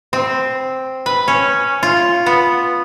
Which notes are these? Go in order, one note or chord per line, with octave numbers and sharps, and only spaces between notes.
C4
B4
C#4
F4
B3